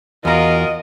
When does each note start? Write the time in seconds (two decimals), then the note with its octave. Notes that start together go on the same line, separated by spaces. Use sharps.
0.25 E2 F4 F#4 A#4 D#5 A#5